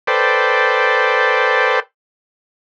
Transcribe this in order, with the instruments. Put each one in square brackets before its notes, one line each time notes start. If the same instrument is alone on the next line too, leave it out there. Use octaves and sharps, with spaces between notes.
[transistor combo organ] A4 B4 C5 D5 G5